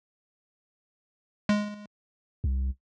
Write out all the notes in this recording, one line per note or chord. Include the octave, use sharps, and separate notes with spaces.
G#3
C2